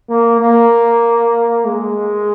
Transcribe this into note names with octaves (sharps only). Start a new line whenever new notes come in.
A#3
A#3
G#3